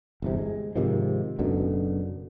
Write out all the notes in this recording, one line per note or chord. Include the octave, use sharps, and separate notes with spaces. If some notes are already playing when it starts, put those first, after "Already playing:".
G1 E2 C3
G#3
G#2 C3 D#3 F3
F#1 F#2 B2 D3